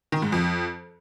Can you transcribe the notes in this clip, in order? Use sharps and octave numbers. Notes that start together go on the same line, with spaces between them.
D#3
G#2
F2